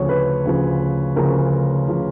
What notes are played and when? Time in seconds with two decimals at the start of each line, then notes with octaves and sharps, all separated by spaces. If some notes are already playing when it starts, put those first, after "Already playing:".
Already playing: D2 C#3 F3 C#5
0.09 B4
0.45 D2 C#3 F3
1.16 D2 C#3 F3 A#4
1.88 C#3 F3